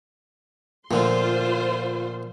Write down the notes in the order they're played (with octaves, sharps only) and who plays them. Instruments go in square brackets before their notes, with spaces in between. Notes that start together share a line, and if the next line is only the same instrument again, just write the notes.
[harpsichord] A#2 D3 [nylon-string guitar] F3 A3 [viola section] F4 C5 C6